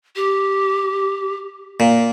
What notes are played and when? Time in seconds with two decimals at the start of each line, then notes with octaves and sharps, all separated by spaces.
0.16 G4
1.80 A#2